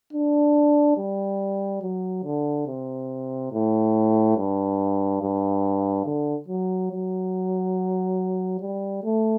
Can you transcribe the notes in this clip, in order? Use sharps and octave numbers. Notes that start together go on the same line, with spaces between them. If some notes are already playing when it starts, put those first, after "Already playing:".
D4
G3
F#3
D3
C3
A2
G2
G2
D3
F#3
F#3
G3
A3